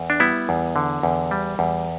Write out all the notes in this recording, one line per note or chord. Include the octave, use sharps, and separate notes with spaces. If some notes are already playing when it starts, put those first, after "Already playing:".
Already playing: E2
D4
G3 B3 E4
E2
D3
E2
G3
E2